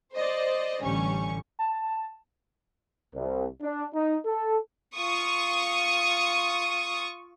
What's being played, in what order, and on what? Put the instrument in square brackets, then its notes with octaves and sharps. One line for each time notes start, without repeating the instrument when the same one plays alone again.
[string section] C5 D5 D#5
A1 D3 G3 C#4 C#6
[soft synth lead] A5
[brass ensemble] C2
D4
D#4
A4
[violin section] F4 C#6 D#6